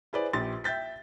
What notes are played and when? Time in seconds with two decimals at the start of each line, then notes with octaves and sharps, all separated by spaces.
0.13 E4 G#4 B4 C5 D5
0.33 A#1 G4 C6 A6
0.64 E5 G5 G6 A6 B6